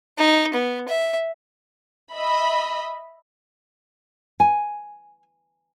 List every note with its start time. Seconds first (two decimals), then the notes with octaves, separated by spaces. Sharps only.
0.18 D#4
0.54 B3
0.88 E5
2.12 D#5 E5 B5
4.40 G#5